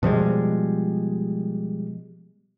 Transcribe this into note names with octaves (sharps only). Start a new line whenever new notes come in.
B2 F3 G3 G#3